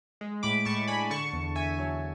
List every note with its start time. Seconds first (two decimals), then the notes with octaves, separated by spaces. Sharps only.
0.21 G#3
0.43 A2 B5 D6
0.65 A2 A5 C#6
0.88 D4 G#5 B5
1.10 D3 A5 C#6
1.33 E2
1.55 E2 E5 G#5
1.78 F#3